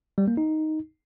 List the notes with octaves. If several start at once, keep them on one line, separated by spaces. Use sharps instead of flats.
G3
A#3
D#4